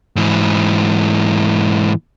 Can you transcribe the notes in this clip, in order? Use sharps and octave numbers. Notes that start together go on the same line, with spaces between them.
G#2 E3